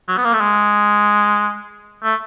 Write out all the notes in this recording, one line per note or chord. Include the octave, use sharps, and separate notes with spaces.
F#3
B3
A#3
A3
G#3
A3